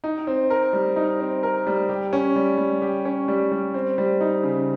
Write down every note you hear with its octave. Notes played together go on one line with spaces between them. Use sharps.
D#4
C4
A#4
G3
D#4
C4
A#4
G3
G4
C#4
G3
G3
G4
C#4
G3
G3
C4
G3
D#4
C#3